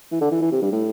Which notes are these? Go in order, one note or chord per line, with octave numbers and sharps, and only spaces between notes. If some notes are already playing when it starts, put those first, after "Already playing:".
E3
D3
E3
E3
C3
G2
A2